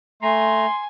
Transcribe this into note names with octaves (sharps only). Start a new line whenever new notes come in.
A3 G#5 A#5 C6